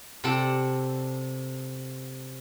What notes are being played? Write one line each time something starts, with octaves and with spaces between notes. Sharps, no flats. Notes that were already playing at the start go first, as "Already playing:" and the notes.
C3 A4 D5 F#5 A5